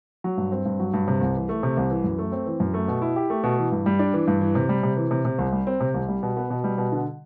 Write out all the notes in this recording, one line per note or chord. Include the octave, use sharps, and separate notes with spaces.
F#3
G2
C4
G2
F#3
G2
C3
C2
E3
A3
C3
C2
E3
F#2
A3
C4
E3
F#2
A3
B2
E4
G4
A3
B2
E3
G2
G3
D4
E3
G2
E3
C3
G3
C3
E3
C3
C3
C2
G3
C4
C3
C2
G3
B2
B3
B2
G3
B2
D3